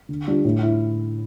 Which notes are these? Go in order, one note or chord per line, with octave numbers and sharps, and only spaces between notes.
D3
G3 D4 F4
A2
E4